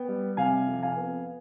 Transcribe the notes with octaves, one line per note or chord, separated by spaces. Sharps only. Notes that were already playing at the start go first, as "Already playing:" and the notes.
Already playing: B3 G5
G3
C3 F5 G#5
F2
F5 G#5
B3